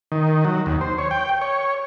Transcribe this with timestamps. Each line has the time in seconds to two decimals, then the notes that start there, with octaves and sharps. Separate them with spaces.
0.12 D#3
0.45 F#3
0.66 D#2
0.81 C5
0.98 C#5
1.11 G5
1.41 C#5